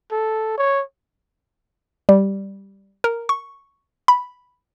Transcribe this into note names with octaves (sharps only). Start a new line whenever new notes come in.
A4
C#5
G3
A#4
C#6
B5